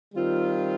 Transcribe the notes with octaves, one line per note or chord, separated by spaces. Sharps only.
D#3 G3 C4 F4